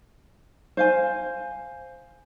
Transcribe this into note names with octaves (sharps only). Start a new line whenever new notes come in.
C5 F5 G#5